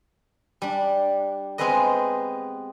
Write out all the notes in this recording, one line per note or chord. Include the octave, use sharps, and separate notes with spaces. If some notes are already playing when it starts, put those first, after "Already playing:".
G3 D4
G#3 B3 C4 G#4 B4 D#5